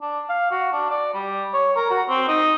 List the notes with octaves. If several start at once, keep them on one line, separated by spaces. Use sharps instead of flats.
D4
F5
F#4
D4
D5
G3
C#5
A#4
F#4
C4
D#4